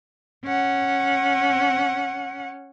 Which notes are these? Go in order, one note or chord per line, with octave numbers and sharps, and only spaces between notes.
C#4 F#5